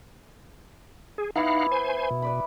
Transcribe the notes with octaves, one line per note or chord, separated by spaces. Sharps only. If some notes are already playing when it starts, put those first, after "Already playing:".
G#4
B3 D#4 E4 F5 F#5 D6
C5 G#5
B2
B4 D5 B5